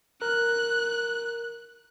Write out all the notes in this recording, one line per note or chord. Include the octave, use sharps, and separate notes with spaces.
A#4 F#6